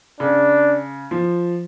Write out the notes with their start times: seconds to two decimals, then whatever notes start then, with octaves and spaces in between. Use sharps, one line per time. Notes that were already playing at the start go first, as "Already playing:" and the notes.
0.20 C#3 D4
1.11 F3